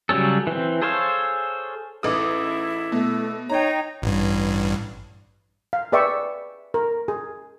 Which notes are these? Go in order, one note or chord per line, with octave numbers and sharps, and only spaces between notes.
C#3 F#3 G3 C#4 A4
E3 C4
G#4 A4 C5 C#5 F5
A1 D#4 E4 G#4 A4 D6 D#6
B2 A3
D#4 C#5 G5 A#5
A1 G2
F5
G#4 B4 D5 E5 G5 C#6
A#4
G#4